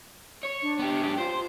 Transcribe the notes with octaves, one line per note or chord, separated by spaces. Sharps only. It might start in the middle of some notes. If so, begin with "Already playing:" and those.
C#5
D4
B3 G4
G#2 G4
F4 C5